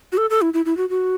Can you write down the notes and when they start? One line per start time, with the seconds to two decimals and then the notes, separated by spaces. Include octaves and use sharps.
0.12 F#4
0.18 A4
0.30 A4
0.42 E4
0.54 E4
0.65 E4
0.77 F#4
0.89 F#4